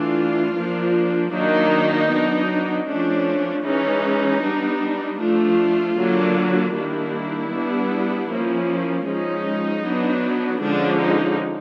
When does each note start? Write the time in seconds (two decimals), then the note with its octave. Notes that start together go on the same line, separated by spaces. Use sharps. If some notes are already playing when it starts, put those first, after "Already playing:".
Already playing: E3 A3 D4 F4
0.56 F3 A#3 D4
1.32 D#3 F#3 A#3 D4 D#4
2.10 F#3 B3 D4
2.87 F3 A3 C#4 D4
3.64 E3 G#3 C#4 D#4
4.42 G3 B3 D4
5.19 F3 A3 D4 F4
5.97 D3 F#3 A#3 D4
6.74 D#3 G3 A#3 D4 E4
7.51 G3 B3 D4
8.29 F3 A#3 C#4
9.06 F3 G#3 C#4 D#4
9.83 F#3 B3 D4
10.60 D3 F3 G#3 C#4 D4
11.00 D#4